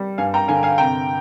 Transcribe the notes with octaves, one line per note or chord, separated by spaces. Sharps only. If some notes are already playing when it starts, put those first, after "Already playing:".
Already playing: G3
G2 F5 G#5
G5 A#5
D3 F5 G#5
F5 G#5
C3 G5 A#5